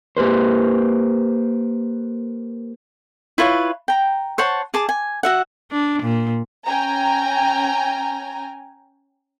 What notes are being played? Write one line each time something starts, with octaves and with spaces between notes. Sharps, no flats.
A#3 G4 B4 C5
E4 F4 B4 C#5
G5 A#5
C5 C#5 F#5 A5
G#4 A5 D6
G#5
F#4 E5 F#5
D4
A#2
C#4 G5 G#5 A#5